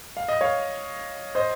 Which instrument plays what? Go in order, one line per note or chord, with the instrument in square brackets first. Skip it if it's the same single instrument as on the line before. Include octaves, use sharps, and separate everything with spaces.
[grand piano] F5
D#5
C#5 F5
C5 D#5